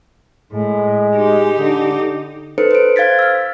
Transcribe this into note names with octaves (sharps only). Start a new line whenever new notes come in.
A2 G#3
D#4 G4
D3
D#4 A4 B4 C5 C#7
C5 D7
C5 F5 G#6 A6 B6
E6 F6